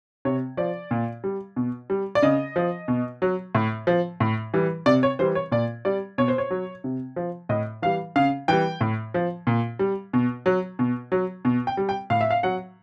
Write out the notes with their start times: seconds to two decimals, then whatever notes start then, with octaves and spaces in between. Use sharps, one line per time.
0.25 C3 C#5
0.57 F3 D5
0.91 A#2
1.24 G3
1.56 B2
1.90 G3
2.15 D5
2.22 C#3 D#5
2.56 F3
2.88 B2
3.22 F#3
3.55 A2
3.87 F3
4.20 A2
4.54 E3 G3
4.86 C3 D5
5.03 C#5
5.19 E3 G3 C5
5.35 C#5
5.52 A#2 D5
5.85 G3 D5
6.18 B2 C#5
6.28 C5
6.38 C#5
6.51 F#3
6.84 C3
7.16 F3
7.49 A2 D#5
7.82 E3 G3 F5
8.16 C#3 F5
8.48 E3 G3 G5
8.81 A2
9.14 F3
9.47 A#2
9.79 G3
10.13 B2
10.46 F#3
10.79 B2
11.12 F#3
11.45 B2
11.67 G5
11.77 G3
11.89 G5
12.10 A2 F5
12.21 E5
12.31 F5
12.43 F#3 F#5